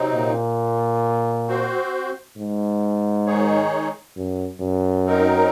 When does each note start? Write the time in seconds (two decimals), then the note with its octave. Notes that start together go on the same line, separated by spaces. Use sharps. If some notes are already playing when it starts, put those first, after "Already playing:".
Already playing: C3 F#3 C4 D#4
0.14 A#2
1.48 C4 F#4 C5
2.37 G#2
3.26 D#3 G#3 D#4 G#4 C#5
4.16 F#2
4.60 F#2
5.05 F#3 C4 D#4 A#4